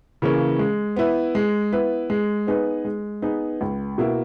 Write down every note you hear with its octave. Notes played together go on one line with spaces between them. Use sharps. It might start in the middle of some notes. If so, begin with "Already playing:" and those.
C#3 E3 A#3 C#4
G#3
B3 E4 B4
G#3
B3 E4 B4
G#3
B3 D#4 G#4 B4
G#3
B3 D#4 G#4 B4
C#2
B2 A#3 E4